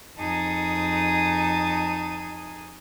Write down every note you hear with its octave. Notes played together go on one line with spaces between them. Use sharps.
F2 D#4 G#4 A5 A#5 D#6